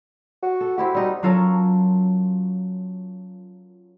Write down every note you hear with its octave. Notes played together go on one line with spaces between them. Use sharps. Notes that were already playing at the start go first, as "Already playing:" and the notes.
F#4
A4
C4 E4 F#4 G4
G3 D#4
F#3 C#4 F4 A4 A#4 C#5